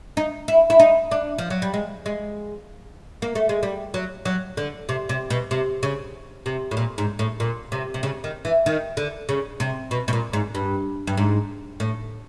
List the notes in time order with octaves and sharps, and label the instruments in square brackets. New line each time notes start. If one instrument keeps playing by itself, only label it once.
[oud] D#4
E4
E4
D#4
D4
F3
F#3
G3
G#3
G#3
A#3
A3
G#3
G3
F#3
F#3
D3
C3
C3
B2
C3
C#3
C3
A2
A#2
G#2
A2
A#2
C3
C3
C#3
D#3
E3
D#3
D3
C#3
C3
B2
B2
A#2
G#2
G2
G2
G#2
A2